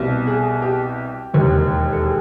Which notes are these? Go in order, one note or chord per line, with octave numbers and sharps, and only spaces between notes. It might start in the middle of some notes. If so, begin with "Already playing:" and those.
Already playing: C2 B2
G#4
G4
E1 D#2 D#3
A4
G#4